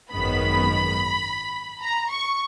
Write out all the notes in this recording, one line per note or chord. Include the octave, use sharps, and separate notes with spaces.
G#1 F#2 D#3 G#3 B3 B5
A#5
C#6